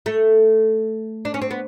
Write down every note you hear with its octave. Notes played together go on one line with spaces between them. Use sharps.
A3
D4
C#4
C4
B3